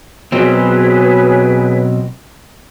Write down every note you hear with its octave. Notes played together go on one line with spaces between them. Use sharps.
B2 F#3 C4 G#4 B4 C#5